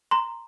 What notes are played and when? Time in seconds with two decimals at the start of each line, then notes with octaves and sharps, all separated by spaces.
0.11 A#5 C6